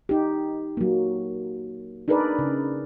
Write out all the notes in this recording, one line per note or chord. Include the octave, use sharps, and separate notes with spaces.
D#4 G4
F#3 A#3
D4 D#4 G#4 A#4 B4 D5
C#3